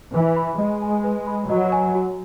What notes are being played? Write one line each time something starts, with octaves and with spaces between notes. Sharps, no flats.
E3 B4
B5
G#3 D#5
G#5
B4
B5
F#3 D#5
G#5
F#4